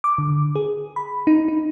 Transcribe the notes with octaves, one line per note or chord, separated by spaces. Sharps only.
D6
D3
G#4
B5
D#4
D#4